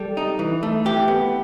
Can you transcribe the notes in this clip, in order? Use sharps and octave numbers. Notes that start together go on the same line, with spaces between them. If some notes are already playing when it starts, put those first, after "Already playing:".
Already playing: G3 A4
D#4
E3
A3
E3 G4
B3